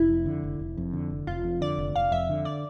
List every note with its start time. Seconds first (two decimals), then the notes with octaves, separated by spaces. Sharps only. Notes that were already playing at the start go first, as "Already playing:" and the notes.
Already playing: F1 E4
0.10 F2
0.26 D3
0.44 F1
0.60 F1
0.77 F2
0.93 D3
1.10 F1
1.27 F1 F4
1.44 F2
1.61 D3 D5
1.79 F1
1.96 F1 F5
2.12 F2 E5
2.29 D3
2.45 D5